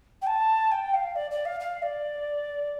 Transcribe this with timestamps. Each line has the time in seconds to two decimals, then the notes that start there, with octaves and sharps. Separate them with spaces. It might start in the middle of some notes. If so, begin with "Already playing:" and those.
0.21 G5
0.26 A5
0.71 G5
0.93 F5
1.15 D5
1.30 D5
1.45 F5
1.60 F5
1.82 D5